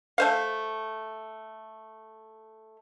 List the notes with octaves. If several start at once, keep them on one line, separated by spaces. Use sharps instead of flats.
A3 C5 F5